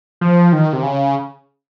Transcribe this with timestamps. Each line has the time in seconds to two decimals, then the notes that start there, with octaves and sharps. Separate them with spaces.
0.21 F3
0.53 D#3
0.73 C3
0.83 C#3